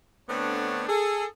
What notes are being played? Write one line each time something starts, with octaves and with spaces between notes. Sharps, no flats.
D3 A3 B3 C4 D4 C#5
G#4 A4